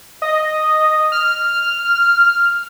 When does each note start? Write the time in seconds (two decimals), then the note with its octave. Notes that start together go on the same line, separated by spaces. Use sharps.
0.22 D#5
1.12 F6